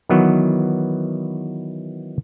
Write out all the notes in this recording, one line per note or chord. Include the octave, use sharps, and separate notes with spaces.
D#3 E3 F#3 B3